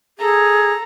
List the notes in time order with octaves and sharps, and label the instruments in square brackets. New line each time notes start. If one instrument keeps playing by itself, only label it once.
[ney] G#4 [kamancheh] A4 A#5